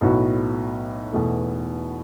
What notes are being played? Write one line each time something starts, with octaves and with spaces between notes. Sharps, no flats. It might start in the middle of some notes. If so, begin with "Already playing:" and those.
B1 A2 F#3 B3 F#4
E2 B2 A3